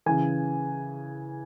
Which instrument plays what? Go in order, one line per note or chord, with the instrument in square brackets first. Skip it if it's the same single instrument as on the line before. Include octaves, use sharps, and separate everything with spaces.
[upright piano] C#3 E3 G#5